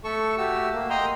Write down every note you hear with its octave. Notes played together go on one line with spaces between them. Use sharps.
A3 A4 C#6 E6
A3 F#4 G4 E6
A#3
D#5 G5 A#5 C6